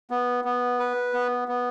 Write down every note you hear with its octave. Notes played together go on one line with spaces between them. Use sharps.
B3
B3
B4
B3
B3